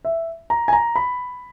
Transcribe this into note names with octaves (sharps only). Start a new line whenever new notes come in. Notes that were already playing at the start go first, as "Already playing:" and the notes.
E5
A#5
G#5
A#5
B5